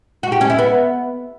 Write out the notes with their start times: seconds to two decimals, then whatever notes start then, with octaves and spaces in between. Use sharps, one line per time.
0.23 F#4
0.32 G4
0.41 C#4
0.50 E4
0.58 B3